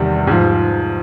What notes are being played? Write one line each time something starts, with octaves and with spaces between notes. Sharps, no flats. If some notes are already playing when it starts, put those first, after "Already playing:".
Already playing: E2 C3 D#3 G3
G#2 F3